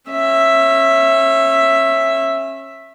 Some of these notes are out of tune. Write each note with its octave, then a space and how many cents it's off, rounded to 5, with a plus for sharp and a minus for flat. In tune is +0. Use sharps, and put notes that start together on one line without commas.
C#4 -25 E5 +5